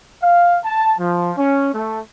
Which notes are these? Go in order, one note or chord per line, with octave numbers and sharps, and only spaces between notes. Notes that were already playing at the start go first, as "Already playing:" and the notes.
F5
A5
F3
C#4
A3